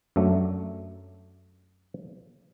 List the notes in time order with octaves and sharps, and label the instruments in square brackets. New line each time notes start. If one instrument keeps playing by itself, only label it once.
[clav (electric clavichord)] F#2 F#3 A3 D4